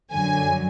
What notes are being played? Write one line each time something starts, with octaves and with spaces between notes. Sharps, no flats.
F#2 D3 F#3 G#5